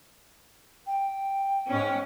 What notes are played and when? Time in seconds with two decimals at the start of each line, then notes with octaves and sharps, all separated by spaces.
0.86 G5
1.67 G#2 C#4